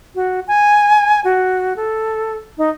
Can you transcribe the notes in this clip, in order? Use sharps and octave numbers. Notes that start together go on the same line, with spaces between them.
F#4
G#5
F#4
A4
D#4